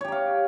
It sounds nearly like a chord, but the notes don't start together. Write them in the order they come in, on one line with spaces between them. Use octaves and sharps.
C#5 G4 A#5 F5